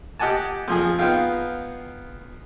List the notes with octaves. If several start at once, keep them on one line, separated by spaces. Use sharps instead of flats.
G4 D#5 F#5 G#5 A5
F2 F3 G#4
B3 D#4 F4 G#4 F5 G5